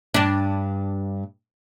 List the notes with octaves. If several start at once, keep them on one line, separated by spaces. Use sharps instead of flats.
G2 D4